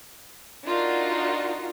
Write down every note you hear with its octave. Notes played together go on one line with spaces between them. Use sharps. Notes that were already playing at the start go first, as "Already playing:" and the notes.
D4 D#4 F4 F#4 A#4